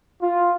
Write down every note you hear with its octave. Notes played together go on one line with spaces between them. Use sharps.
F4